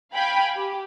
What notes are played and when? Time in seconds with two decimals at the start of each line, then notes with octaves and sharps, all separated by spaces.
0.14 F5 G5 G#5 B5
0.55 G4